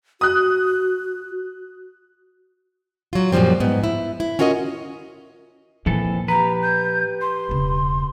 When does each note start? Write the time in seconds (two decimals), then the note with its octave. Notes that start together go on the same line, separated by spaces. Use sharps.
0.21 F#4 D#6 F#6
3.13 F#3 F4
3.32 F#2 A#2 F3 G3 C4
3.60 G#2 B3
3.84 E4
4.20 E4
4.39 C#4 F4 F#4 A#4 D5 D#5
5.86 F2 A#2 E3 F3 A4
6.28 G4 B4 A#5
6.62 G6
7.21 C6
7.49 E1 C#3